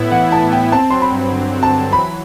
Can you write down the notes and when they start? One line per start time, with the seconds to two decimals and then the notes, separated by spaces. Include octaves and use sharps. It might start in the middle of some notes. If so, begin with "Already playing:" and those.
Already playing: A2 B3 E4
0.12 E3 F#5
0.31 E4 A5
0.51 B3 G5
0.72 C4 A5
0.90 F#3 C6
1.02 B5
1.12 G2
1.32 D3
1.53 C4
1.63 A5
1.73 F#3
1.93 E3 B5